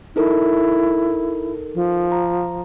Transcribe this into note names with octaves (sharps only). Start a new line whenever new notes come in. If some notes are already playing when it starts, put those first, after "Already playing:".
D#4 E4 A4 A#4
F3
A#5